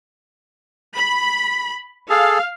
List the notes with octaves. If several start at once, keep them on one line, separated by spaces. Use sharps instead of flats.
B5
G#4 A4 F5